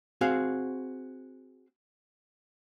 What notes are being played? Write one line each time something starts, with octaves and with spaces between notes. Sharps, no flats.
C4 F#4 G#4 F5